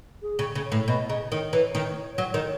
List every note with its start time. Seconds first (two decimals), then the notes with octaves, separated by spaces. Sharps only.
0.22 G#4
0.39 C#3
0.55 C#3
0.66 C#5
0.72 A2
0.88 B2 D#5
1.09 C#3 D#5
1.31 D#3 C#5
1.52 E3 C#5
1.75 D#3
2.18 F#3
2.34 D#3